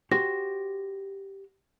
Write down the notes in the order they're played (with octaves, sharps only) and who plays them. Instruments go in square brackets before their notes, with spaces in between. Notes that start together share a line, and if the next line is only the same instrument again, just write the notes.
[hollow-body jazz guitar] F#4 G4 C5 [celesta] A#6